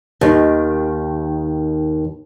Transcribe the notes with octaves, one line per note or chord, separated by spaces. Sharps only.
D#2 D#3